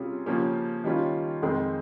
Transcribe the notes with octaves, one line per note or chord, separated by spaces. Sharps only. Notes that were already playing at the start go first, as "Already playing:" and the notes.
Already playing: C3 G3 C#4 F4 G#4
C#3 F3 A#3 C#4 G4
D#3 G3 C#4 F4
F2 D#3 G#3 C4